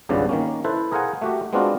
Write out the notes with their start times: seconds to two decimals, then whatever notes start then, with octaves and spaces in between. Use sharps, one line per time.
0.09 G#1 C#2 G2 C#3 B3 D5
0.29 D#3 A#3 C#4
0.65 E4 A4 B4 C5
0.92 G#4 A#4 C5 F5 F#5 G#5
1.22 A3 F#4 G4
1.53 G#3 B3 C4 D4 F4 F#4